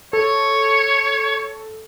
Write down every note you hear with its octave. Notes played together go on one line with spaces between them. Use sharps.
A4 C#5